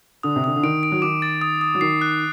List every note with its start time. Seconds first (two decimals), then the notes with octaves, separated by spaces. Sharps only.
0.23 D3 D#6
0.36 C3
0.44 D3 D#6
0.56 D3
0.63 D#3 D7
0.83 D7
0.92 F#3
1.02 D#3 D6
1.22 A6
1.41 D#6
1.61 D#6
1.75 F#3
1.81 D#3 C7
2.01 F#6